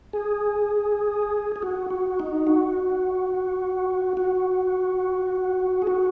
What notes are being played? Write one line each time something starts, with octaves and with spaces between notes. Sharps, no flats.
G#4
G#4
F#4
F#4
D#4
F#4
F#4
G#4
F#4